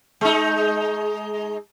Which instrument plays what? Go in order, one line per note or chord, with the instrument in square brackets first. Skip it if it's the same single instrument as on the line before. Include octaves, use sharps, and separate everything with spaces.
[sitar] G#3 D#4